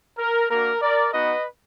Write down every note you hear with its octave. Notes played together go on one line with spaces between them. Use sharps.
A#4
A#3 D4 F#4 A#4
A#4 D5
B3 D#4 F#4 B4 D#5